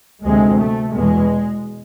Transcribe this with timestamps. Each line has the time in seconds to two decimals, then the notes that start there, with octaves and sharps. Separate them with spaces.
0.23 D2 C3 G#3
0.58 A3
0.92 E2 B2 G#3